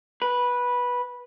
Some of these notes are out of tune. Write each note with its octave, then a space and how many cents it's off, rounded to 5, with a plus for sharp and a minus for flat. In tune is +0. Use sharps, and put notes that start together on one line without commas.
B4 -10